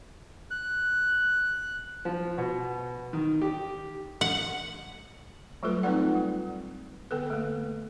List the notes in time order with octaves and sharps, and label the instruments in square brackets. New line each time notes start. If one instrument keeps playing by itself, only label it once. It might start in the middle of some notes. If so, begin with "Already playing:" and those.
[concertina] F#6
[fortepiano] F3
B2
D#3
G4
[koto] F#5
[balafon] F#3 G3 A3 F4 A4 B4
C4 D#4 F4 B4 D5 F#5
G3
D3 B3 A4 B4
A3 A#3